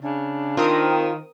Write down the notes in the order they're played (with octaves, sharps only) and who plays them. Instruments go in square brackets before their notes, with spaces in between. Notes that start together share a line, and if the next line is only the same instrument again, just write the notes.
[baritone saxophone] C#3 [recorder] D4
[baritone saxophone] D#3 [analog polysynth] C4 A#4 D#6 [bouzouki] F4